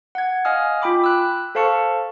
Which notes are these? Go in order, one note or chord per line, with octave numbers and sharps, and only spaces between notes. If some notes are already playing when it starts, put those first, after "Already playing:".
F#5 G#6
D#5 F5 G#5 D#6 F6
F4 G5 B5 D6
E6 F#6
A4 C5 F5 A5 C#6 C#7